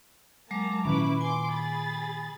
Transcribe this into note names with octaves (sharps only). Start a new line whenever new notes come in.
F#3 G#3 A#3 A5 A#5 D6
A#2 D#3 F3 C#4 E4 B4 D6
G#5 C6 D6
G#4 B5 A6